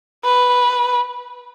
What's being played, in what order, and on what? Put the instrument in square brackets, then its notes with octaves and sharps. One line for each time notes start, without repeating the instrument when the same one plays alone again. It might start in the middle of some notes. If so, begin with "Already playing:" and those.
[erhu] B4